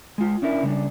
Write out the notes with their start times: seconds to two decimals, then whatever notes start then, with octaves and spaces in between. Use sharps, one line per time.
0.18 G#3 F4
0.42 C#4 D4 E4 A#4
0.63 C#3 G3 D4